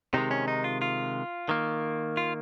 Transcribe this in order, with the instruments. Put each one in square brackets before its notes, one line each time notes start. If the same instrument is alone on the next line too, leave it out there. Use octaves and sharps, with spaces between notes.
[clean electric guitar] C3 D#3 G#3 D#4
C#4
D#4
F4
F4
D#3 A#3
F4